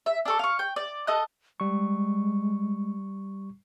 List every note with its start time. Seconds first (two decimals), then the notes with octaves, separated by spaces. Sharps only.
0.06 E5
0.25 D4 A4 C#6
0.39 F5 C#6
0.59 G5
0.76 D5
1.07 A4 D#5 F#6
1.60 G3 G#3 C#6